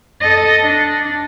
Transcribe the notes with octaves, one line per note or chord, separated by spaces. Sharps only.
A4 D#5
D4